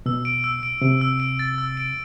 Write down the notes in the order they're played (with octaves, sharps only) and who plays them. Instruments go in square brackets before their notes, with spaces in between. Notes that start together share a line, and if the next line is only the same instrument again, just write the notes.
[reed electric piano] B2 [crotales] E6
[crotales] D7
E6
D7
[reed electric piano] C3 [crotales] D7
[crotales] E6
D7
A6
E6
D7